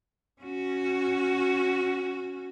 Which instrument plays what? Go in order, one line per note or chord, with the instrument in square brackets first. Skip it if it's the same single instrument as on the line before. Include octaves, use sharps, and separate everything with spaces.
[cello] C#4 F#4